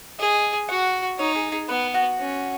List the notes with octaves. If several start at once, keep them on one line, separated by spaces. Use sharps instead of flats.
G#4 D#5
F#4 F#5
D#4 C#5
G#4
G#4
B3 B4
F#4
C#4